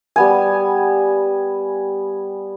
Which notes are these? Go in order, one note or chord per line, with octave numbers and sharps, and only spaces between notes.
G3 B3 G#5